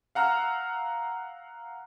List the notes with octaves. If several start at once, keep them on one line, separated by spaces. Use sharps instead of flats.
F5 F#5 A#5 E6 F6